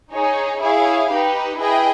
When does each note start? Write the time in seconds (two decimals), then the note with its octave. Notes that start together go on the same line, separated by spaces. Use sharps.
0.12 D#4 G#4 C#5
0.61 E4 G#4 C#5 F5
1.10 D#4 G4 B4
1.58 E4 G#4 B4 D#5 G5